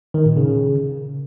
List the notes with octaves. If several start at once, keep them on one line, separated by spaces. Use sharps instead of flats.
D#3
A#2
C#3